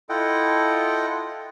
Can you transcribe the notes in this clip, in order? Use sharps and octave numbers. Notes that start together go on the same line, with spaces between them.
E4 F4 A4 D#5 F#5 G5